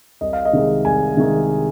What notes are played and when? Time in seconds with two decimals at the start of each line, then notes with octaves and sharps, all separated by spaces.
0.21 C2 D#5
0.33 F5
0.45 D#5
0.53 C3 D#3 G#3
0.85 C2 G#5
1.17 C3 D#3 G#3